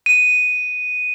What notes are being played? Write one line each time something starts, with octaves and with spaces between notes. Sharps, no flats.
D#7